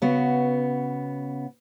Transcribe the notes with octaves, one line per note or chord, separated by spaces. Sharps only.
C#3 B3 F#4